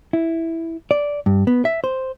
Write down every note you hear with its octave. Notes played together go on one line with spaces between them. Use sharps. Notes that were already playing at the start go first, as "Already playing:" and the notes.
E4
D5
G2
B3
E5
C5